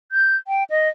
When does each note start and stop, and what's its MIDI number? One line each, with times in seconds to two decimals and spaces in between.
0.12 0.36 91
0.47 0.64 79
0.70 0.89 75